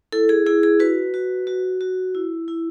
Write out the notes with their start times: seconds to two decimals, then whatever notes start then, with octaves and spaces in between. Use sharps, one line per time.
0.12 E4 A4
0.29 G#4
0.46 E4 G#4
0.63 G#4
0.80 F#4 B4
1.14 F#4
1.47 F#4
1.81 F#4
2.15 E4
2.48 E4